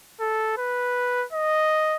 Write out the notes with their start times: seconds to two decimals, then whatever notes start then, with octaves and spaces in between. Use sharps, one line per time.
0.20 A4
0.57 B4
1.32 D#5